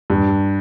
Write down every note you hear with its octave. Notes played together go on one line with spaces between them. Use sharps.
G2